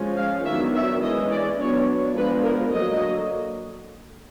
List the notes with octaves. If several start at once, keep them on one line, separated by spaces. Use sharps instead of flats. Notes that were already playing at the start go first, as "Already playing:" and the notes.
Already playing: F3 G#3 C#4
F5
D#3 F#3 B3 D4 E5
E5
E3 G#3 C#4 D#5
D5
F#3 B3 D4 C#5
F3 G#3 B3 D4 B4
A#4
D3 F#3 A#3 D#5